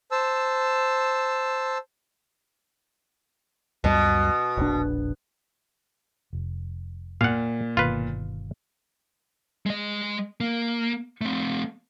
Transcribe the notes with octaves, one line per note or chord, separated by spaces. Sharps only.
C5 A5 E6
C#2 F#2 B2 G3
E1 A#1 D4
F1
A#2 F5 F#5
G1 B2 D#3 F4 B4
G#3 D#5
A#3
A3 C4